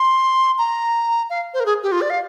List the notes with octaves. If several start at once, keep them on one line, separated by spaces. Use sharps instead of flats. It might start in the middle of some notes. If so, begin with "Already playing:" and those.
Already playing: C6
A#5
F5
C5
A#4
G#4
G4
F4
D5
F5